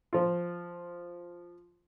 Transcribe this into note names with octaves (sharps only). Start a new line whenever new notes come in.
F3 F4